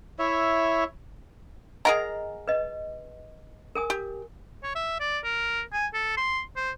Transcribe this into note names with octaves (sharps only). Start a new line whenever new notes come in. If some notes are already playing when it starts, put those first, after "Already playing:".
E4 C#5 E5
G#4 A#4 D#5 F#5 G#5 A#5
B4 D#5
A#4 G#5 D#6
G4
C#5
E5
D5
A#4
G#5
A4
C6
C5